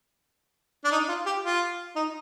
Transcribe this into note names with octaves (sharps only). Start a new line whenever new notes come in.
D4
D#4
F4
G4
F4
D#4